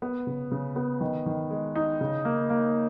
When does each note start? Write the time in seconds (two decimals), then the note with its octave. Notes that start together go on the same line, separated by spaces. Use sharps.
0.02 B3
0.27 C#3
0.51 C#3
0.76 B3
1.00 D#3
1.26 D#3
1.51 G#3
1.75 D#4
2.01 C#3
2.25 A#3
2.50 A#3